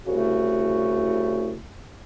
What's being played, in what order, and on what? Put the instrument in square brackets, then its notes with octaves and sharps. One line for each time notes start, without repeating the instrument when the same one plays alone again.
[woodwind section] C2 C#3 A3 E4 F#4